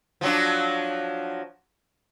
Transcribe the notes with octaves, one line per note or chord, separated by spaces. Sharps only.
F3 F#3 D4